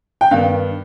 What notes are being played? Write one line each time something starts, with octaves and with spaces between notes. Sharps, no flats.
G5
G2 D#3 B3 F5